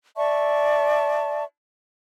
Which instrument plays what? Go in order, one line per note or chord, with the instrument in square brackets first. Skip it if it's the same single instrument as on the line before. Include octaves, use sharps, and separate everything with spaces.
[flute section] D5 E5 A5 C#6